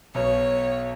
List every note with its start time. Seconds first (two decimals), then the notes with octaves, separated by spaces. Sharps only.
0.14 B1 B2 C#5